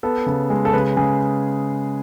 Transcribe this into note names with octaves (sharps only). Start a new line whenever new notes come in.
B3 A4
C#3
G#3
A4
C#3 B4
C#3 G#4